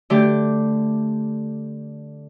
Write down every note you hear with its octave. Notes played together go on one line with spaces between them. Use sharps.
D3 A3 G4